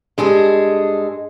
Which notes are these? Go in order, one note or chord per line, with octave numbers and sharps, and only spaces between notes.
G2 G#3 G#4 A4